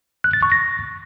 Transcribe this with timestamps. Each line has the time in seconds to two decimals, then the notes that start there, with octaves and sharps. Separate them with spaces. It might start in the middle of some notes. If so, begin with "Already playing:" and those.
0.24 F#6
0.33 A6
0.43 C#6
0.52 A#6